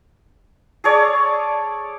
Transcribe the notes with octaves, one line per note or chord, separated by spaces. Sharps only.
G#4 A4 C#5 D5